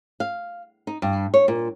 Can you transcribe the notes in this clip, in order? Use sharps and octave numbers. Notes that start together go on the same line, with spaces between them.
F5
D#4
G2
C#5
A#2